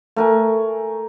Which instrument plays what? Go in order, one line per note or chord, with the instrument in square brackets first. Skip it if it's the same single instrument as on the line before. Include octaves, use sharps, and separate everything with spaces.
[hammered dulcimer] A3 A#4 G#5